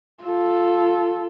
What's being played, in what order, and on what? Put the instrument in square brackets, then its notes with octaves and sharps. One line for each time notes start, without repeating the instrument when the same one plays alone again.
[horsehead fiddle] F4 A4